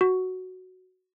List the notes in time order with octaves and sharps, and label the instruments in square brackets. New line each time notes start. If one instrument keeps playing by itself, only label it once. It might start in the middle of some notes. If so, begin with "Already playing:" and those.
[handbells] F#4